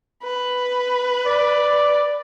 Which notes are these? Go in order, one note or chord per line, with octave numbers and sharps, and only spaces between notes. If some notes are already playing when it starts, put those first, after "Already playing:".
B4
D5